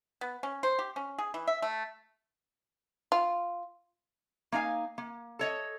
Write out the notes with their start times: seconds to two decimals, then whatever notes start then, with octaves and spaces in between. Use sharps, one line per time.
0.21 B3
0.43 C#4
0.63 C5
0.79 G4
0.96 C#4
1.18 G#4
1.34 E3
1.47 E5
1.62 A3
3.12 F4
4.52 A#3 D#4 F5 G#5
4.98 A#3
5.39 A4 C#5 D#5